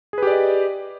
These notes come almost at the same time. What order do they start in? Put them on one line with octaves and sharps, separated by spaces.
G#4 B4 G4 D5 D#5